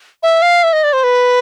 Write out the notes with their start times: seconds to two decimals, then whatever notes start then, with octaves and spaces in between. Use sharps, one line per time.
0.23 E5
0.42 F5
0.63 E5
0.73 D#5
0.84 D5
0.93 C5
1.04 B4